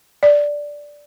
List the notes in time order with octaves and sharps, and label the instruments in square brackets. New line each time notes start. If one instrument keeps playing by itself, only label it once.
[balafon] D5